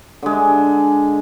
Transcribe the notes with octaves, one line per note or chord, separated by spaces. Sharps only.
D3 G#3